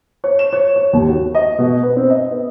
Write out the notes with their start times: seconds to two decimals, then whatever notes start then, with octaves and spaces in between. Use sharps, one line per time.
0.24 C#5
0.39 E7
0.53 C#5
0.76 C#5
0.93 D#2
1.09 F#4
1.35 D#5
1.59 B2
1.83 B4
1.96 C4
2.10 D#5
2.31 B3